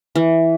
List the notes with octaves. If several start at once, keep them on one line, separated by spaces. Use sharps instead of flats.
E3